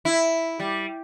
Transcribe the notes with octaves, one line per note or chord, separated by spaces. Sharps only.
E4
G3